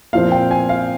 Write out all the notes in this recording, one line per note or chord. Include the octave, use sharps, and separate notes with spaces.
A#2 F3 C4 F5
G5
G#5
F5